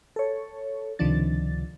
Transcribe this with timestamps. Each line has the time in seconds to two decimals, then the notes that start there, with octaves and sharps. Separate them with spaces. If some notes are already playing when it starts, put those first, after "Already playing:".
0.16 A4 C#5
0.99 C#2 C3 D#3 F3 D4 A6